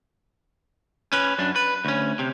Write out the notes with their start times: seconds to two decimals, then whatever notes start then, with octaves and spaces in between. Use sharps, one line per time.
1.13 C#4 B4
1.39 F#2 D4
1.56 B4
1.85 D2 C#4
2.19 C3